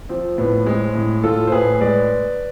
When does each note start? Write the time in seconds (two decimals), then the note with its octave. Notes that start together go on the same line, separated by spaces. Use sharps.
0.09 F3 C4
0.38 A2 B3
0.66 G#3 C4
0.95 A2
1.23 A2 F4 A4
1.47 C5
1.52 A2 G#4 B4
1.81 G#3 B4 D5